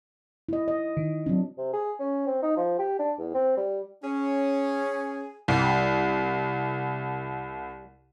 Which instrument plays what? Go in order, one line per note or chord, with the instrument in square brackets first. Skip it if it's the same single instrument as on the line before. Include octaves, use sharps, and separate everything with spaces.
[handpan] E4 D#5
D#5
[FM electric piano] D#3
[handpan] F#3 C4 D4
[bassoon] C3
G#4
C#4
C4
D#4
F3
G4
D4
E2
C4
G3
[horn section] C#4 [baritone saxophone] G#4
[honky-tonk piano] C2 [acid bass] G3